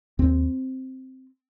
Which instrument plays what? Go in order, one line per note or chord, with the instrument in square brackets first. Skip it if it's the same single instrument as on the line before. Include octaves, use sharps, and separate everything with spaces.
[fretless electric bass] D#2 C4